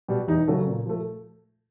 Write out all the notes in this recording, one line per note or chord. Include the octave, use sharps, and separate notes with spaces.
B2 G3
E2 D#4
C#3 F#3 A3
A#2
F3 A3